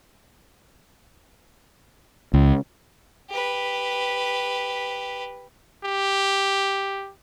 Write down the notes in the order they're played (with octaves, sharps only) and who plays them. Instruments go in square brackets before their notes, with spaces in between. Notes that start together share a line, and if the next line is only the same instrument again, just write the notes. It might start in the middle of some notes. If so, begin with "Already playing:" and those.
[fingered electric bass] C#2
[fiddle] G4 B4
[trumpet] G4